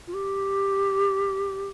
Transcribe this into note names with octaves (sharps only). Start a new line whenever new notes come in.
F4
G4